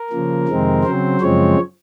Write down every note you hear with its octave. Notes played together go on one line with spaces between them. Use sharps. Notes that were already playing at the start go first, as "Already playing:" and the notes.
Already playing: A#4
C#3 F3 A#3
F2 C3 D#3 G#3 C4
C#3 F#3 C4 C5
F#2 C#3 F3 G#3 C4 C#5